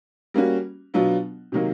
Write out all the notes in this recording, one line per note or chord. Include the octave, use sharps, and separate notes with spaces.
G3 A#3 C#4 F#4
B2 F#3 B3 D4 F4
C3 D#3 F#3 A#3